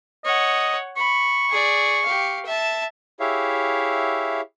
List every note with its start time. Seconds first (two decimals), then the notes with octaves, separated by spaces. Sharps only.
0.25 C#5 D#5 F#5
0.97 B5 C#6
1.49 G#4 D5
2.04 G4 F5
2.45 E5 A5
3.20 E4 G4 G#4 C#5 E5 F5